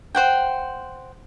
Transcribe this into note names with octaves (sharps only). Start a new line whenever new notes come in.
C5 F#5 G5